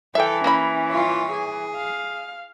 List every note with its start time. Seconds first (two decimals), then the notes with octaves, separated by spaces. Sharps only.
0.15 E3 A4 E5 G5
0.44 A#3 C#4 E4 B5
0.91 F4 C#5
1.33 G#4
1.76 F5